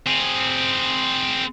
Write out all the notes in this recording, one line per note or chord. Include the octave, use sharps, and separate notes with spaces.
C4 G#4